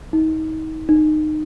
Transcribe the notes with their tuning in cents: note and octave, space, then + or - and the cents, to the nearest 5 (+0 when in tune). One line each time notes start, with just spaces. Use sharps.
D#4 +30
D#4 -20